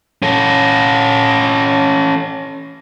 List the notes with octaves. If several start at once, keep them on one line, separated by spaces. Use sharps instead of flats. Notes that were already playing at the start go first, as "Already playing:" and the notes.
C#4 A4